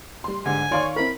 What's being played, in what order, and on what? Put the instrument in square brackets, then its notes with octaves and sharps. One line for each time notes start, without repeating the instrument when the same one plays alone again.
[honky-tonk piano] G3 C6
[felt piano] G#2 D3 [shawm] G#5
[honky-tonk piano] D#3 F5 C#6 [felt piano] C#5 D5 C6
[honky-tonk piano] C4 E4 A#4 [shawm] B5